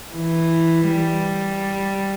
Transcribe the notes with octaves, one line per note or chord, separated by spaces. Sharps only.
E3
G3